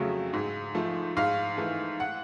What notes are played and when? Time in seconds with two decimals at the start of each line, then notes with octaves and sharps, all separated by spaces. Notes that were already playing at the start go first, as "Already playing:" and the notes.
Already playing: F2 C#3 F#3 A3
0.33 G#2
0.75 F3 A3
1.17 G#2 F5
1.57 E3 A3
2.00 F#5